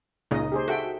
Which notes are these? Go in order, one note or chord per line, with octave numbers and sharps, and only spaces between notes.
C#2 A#2 C#3 D#4 D#5
G4 G#4 C5
F#4 A4 E5 G5